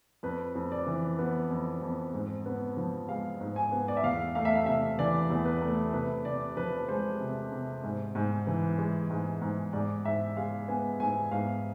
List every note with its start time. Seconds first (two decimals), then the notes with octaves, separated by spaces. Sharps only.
0.23 F2 B4
0.55 F2
0.72 D5
0.87 E3
1.19 B3
1.50 F2
1.82 F2
2.14 G#2
2.46 B3
2.77 F3
3.08 G#3 F5
3.40 G#2
3.56 G#5
3.72 B3
3.88 D5
3.97 E5
4.04 E2 F5
4.35 A3 F5
4.45 E5
4.55 F5
4.66 C3 E5
4.99 E3 D5
5.30 E2
5.45 B4
5.62 A3
5.93 C3 B4
6.25 C3 D5
6.57 F3 B4
6.88 G#3 C5
7.20 C3
7.52 C3
7.83 G#2
8.15 G#2
8.47 E3
8.78 G#3
9.10 G#2
9.42 G#2
9.73 G#2 D5
10.05 G#2 E5
10.37 G#3 F5
10.68 B3 G#5
11.00 G#2 G#5
11.31 G#2 F5